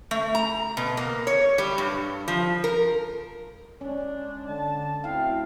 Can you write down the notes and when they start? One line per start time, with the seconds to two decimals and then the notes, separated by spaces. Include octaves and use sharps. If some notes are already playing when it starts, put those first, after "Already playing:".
0.11 A3
0.35 A#5
0.77 B2
0.97 A#3
1.27 C#5
1.58 G3
1.78 G2
2.28 F3
2.64 A#4
3.81 G#3 C#4 D4
4.48 D3 D4 A5
5.04 D2 C4 E4 F5 G5